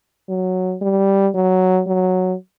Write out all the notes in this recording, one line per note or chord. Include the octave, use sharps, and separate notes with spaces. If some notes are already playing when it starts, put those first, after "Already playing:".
F#3
G3
F#3
F#3